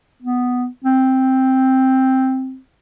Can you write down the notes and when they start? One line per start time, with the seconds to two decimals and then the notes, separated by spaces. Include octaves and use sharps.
0.23 B3
0.84 C4